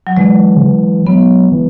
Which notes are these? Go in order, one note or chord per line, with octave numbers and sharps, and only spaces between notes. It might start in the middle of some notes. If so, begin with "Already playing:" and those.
F#3
E3 G#3
C#3
E3
F#3 B3
E3